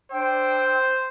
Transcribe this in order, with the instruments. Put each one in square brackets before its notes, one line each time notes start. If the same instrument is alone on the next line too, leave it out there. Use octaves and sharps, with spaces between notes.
[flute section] D4 G5 E6 [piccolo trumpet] C5